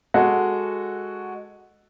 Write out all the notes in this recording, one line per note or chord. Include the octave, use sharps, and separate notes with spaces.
G#3 F#4 A4